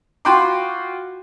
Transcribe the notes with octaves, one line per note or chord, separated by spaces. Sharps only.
F4 F#4 G5 B5 C6 D6